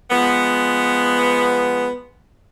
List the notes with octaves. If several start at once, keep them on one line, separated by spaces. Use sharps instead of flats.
F3 G#3 B3